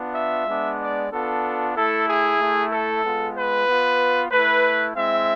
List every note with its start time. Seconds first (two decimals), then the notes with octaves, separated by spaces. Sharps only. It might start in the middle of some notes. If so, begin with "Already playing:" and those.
Already playing: B3 D4 F4
0.14 E5
0.46 G#3 B3 D4
0.79 D5
1.11 B3 D4 F4 A4
1.75 A3 E4 A4
2.07 G#4
2.40 A3 E4
2.71 A4
3.03 G#3 B3 F4
3.35 B4
3.67 B3 F4
4.31 A3 E4 B4
4.95 G#3 C4 E4 E5